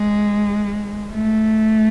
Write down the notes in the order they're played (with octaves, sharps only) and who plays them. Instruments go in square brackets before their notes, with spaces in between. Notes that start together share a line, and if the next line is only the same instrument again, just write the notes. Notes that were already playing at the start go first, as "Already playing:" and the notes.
Already playing: [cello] G#3
A3